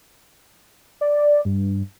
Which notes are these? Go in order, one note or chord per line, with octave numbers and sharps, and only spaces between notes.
D5
G2